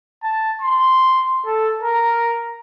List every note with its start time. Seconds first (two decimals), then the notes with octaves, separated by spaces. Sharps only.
0.23 A5
0.62 C6
1.46 A4
1.83 A#4